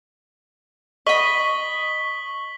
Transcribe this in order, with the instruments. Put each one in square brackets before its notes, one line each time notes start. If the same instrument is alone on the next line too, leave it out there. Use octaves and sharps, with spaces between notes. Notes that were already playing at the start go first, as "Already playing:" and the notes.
[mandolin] D#5 B5 [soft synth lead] C#6 [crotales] B6 F#7 G7